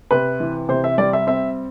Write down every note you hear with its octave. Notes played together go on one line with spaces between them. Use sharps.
C3 B4
E3
C3 C5
E5
G3 D5
E5
C4 E5